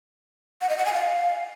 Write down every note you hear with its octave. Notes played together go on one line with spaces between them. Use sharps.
F#5
D#5
F#5
G#5
F5